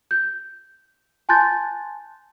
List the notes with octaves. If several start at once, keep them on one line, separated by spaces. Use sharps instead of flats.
G6
G#5 A5 C6 F#6 G6 A6